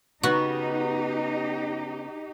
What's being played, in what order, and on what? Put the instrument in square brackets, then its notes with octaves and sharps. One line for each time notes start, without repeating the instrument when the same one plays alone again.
[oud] C#3 B3 [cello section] D#4 G4 [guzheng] F#4